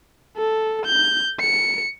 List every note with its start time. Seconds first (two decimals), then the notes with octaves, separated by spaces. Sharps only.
0.37 A4
0.86 G6
1.40 C#7